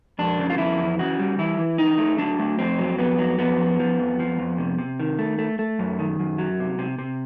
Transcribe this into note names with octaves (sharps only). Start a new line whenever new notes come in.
F2 D4
C#3
F4
F2 E4
E3
C#3 F#4
G3
E3 E4
E3
C#3 D#4
A3
F#3 D4
A3
F2 C4
F#3
F2 B3
F#3
F2 B3
F3
F3
F2
F3
F2
C3
C3
D#3
A3
A3
A3
F#2
D#3
F#2
F#3
C3
C3
C3